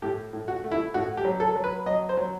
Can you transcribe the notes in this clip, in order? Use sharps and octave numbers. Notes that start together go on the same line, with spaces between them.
A2 G4
A2
F#4
A3
E4
A2 F#4
G4
F#3
A4
F#3
B4
F#3 D#5
C5
F#3